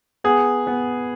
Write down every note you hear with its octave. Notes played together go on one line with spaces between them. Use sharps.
B3 G#4
B3